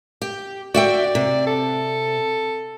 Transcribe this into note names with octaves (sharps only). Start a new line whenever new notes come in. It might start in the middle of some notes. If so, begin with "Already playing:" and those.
G4
F#4 D5 E5 G5
C3
A4